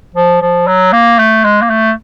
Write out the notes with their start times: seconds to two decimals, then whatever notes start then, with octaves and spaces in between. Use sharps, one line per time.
0.15 F3
0.42 F3
0.67 F#3
0.92 A#3
1.19 A3
1.44 G#3
1.62 A#3
1.70 A3